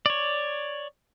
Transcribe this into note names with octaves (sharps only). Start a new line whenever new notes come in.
C#5 D5